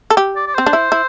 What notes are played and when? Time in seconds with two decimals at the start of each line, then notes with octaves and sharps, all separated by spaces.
0.10 A4
0.17 G4
0.36 D5
0.47 D5
0.54 C4 C5
0.66 D4
0.73 E4
0.92 E4